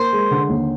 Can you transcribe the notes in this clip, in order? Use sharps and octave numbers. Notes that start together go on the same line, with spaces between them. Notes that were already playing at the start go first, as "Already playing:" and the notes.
Already playing: A#3 C5
G#3
D3
D#2